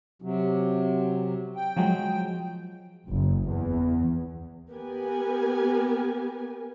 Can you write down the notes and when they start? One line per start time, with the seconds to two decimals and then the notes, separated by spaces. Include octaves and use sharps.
0.22 C3 F#3
1.56 G5
1.77 F3 F#3 G#3
3.08 F#1
3.47 E2
4.71 B3 G4 A#4 G#5